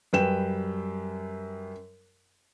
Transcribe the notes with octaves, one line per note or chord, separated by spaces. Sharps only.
F#2 G3 B4 G5 E7